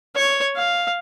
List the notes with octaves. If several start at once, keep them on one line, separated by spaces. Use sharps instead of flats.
C#5
F5